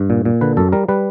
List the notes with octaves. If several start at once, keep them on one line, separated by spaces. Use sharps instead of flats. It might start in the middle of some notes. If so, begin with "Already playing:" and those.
Already playing: G2
A#2
A#2
D3 B4
F#2 A4
G3 A#4
G3 B4